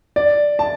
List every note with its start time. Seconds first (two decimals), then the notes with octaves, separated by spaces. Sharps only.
0.16 D5
0.59 A5